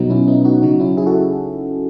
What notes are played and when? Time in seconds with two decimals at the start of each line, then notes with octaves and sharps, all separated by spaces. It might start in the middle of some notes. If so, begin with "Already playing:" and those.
Already playing: B2 F#3 B3 D#4
0.10 C#4 E4
0.28 B3 D#4
0.45 D#4 F#4
0.62 C#3 F#3 D#4 F#4
0.80 C#4 E4
0.97 E4 G#4
1.06 F#4 A4